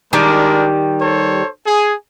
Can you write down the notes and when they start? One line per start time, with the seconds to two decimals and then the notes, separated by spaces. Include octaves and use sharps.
0.13 D#3 G3 G#3 D4 A#4
1.00 A4 C5 C#5
1.66 G#4